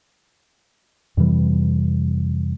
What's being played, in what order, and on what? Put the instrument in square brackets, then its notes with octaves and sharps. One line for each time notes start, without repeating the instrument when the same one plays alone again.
[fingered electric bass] F2 C3 E3 G3